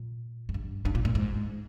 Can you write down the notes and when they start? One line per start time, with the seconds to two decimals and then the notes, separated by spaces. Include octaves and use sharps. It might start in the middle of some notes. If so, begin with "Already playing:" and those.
Already playing: A#2
0.49 G#2
0.54 G2
0.85 G2
0.95 A#2
1.05 A#2
1.15 G#2